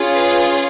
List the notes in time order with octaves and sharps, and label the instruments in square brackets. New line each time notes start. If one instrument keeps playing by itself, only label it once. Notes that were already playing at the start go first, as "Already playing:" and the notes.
Already playing: [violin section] C#4 F4 G#4
B4